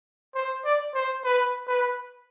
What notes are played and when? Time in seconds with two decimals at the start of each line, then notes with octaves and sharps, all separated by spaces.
0.35 C5
0.65 D5
0.95 C5
1.24 B4
1.68 B4